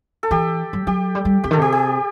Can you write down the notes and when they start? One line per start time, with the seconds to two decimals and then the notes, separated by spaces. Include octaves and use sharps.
0.23 A4
0.31 E3 G4
0.73 F#3
0.87 F#3 G4
1.15 G3
1.25 G3
1.44 C3 G4
1.51 D#3 A4
1.59 C3 G4
1.72 G4